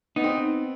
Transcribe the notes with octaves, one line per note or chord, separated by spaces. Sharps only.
B3 D#4
C4